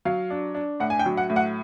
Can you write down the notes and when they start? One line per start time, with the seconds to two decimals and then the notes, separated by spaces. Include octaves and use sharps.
0.05 F#3 F5
0.30 D4
0.55 D4
0.80 A2 F#5
0.90 G#5
0.99 G5
1.06 F#3
1.17 F#5
1.30 A2
1.36 F#5